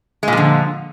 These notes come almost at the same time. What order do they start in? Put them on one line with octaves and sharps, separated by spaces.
G#3 A#2 F3 D3